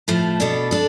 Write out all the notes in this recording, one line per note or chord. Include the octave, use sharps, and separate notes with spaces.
A2 F3 A3
B2 B3 D4 A4
D4 A4